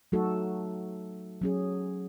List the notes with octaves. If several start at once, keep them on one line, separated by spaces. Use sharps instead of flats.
F#3 A3 D#4 F#4 A4
F#3 C#4 G#4